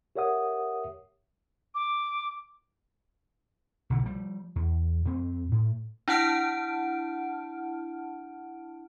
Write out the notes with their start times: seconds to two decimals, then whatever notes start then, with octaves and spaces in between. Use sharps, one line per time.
0.16 G4 A#4 C#5 E5 F#5 D#6
1.75 D6
3.90 B1 D3
4.04 F3 G3
4.56 E2
5.05 F2 C4
5.52 A2
6.08 D4 E4 F#5 A5 F6 D7